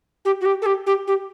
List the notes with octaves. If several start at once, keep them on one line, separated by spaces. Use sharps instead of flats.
G4
F#4
G4
A4
G4
G4
G4